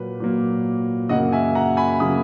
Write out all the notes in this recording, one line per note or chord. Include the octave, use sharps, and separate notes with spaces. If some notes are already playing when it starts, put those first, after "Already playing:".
Already playing: A#2 F#3 A#3 B4
A#2 F#3 A#3
F#2 C#3 F#3 A#3 D#5 F#5
E5 G#5
F#5 A#5
G#5 B5
C#3 F#3 A#3 B5 D#6